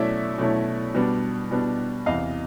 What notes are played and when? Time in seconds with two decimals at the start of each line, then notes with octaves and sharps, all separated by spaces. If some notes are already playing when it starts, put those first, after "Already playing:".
Already playing: B2 F#3 A3 C#4 E4 D5 E5
0.38 B2 F#3 A3 C#4 E4
0.94 B2 G3 B3 D4
1.51 B2 G3 B3 D4
2.06 E2 C3 E3 D#5 F5